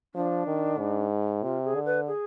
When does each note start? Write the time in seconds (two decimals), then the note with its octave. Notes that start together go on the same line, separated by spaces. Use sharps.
0.15 F3 D4
0.47 D#3
0.79 G#2
1.43 C3 F4
1.65 G#4
1.75 D3
1.85 B4
2.07 G#4